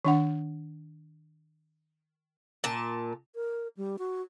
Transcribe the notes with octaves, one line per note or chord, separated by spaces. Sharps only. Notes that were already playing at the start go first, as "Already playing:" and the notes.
D#3 D4 F#5
A#2 A5
A#4
G3
F#4